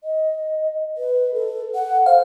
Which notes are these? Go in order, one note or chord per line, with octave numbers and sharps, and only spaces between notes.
D#5
B4
A4
F#5
C5 F5